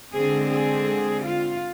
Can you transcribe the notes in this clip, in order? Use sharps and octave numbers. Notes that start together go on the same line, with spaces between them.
D3 G#3 C4 G#4
G#4
F4